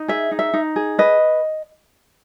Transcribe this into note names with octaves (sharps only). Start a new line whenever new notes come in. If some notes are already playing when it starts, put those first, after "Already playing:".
Already playing: D#4
G#4 E5
D#4
E5
D#4
G#4
B4 D#5